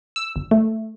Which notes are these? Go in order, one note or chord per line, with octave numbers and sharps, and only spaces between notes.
E6
G1
A3